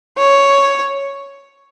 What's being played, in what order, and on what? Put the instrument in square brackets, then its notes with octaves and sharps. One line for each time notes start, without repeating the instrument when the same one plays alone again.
[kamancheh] C#5